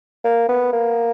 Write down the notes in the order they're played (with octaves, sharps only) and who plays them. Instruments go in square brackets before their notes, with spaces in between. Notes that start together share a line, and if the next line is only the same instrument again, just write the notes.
[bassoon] A#3
B3
A#3